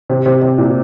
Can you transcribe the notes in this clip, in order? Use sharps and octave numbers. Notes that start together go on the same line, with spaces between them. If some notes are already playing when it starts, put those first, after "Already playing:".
C3
C3
C3
A#2